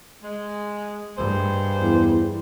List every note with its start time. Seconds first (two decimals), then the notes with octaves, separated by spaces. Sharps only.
0.23 G#3
1.17 G2 G#3 A#3 C5
1.81 E2